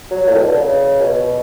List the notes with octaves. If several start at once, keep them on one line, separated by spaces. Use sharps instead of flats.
F#3
A2
B2
D3
C#3
B2